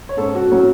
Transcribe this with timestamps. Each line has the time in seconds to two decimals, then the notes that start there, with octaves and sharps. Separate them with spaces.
0.09 C#5
0.17 G#2 G#3 C#4 A4
0.35 F#4
0.52 A2 F#3 A3 C#4